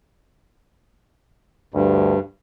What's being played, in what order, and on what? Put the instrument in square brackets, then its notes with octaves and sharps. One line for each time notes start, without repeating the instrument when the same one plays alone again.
[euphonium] D2 [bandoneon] G2